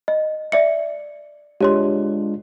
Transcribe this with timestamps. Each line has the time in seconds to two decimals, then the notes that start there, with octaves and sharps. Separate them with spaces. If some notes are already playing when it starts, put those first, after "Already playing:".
0.08 D#5
0.52 D5 E5 C#7
1.61 G#3 D4 F4 G4 C#5 C6